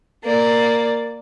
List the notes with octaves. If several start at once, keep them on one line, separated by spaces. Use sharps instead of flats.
A#3 D5